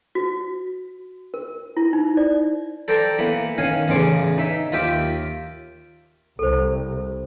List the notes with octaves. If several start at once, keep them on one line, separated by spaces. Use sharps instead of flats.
F#4
A#4
E4
D#4
D5
A4 C5 D5 G5 A#5
E3 A#3 B3
D#3 C#4 F5 G#5
A1 E2 C#3 C#4 C6 D6
D#4 E5
D#2 F4 E5 G5 D6
C2 A4 C5